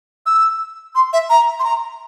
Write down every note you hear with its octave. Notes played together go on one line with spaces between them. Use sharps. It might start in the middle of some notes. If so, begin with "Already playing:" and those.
E6
C6
E5
A#5
C6
A#5